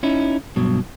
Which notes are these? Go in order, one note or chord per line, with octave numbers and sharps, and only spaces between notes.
C#4 D#4 E4
G2 B2 F#3